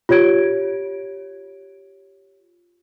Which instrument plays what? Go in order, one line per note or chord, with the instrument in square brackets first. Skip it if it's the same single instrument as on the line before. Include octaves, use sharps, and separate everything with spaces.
[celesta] F4 G4 C#5 G#6 D7